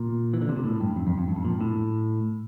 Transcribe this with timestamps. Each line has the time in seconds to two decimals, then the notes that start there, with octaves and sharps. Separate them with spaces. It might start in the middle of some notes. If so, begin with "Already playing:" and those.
Already playing: A#2
0.34 E3
0.41 D3
0.49 C3
0.57 A#2
0.64 A2
0.80 G2
0.96 F2
1.07 F2
1.18 F2
1.28 G2
1.36 F2
1.45 A#2
1.53 G2
1.61 A2